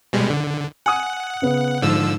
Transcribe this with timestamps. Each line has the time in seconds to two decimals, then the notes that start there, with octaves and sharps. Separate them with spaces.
0.13 B2 G3 G#3
0.30 D3
0.86 F#5 G#5 D#6
1.42 C#3 B3
1.82 G#2 D3 F3 E6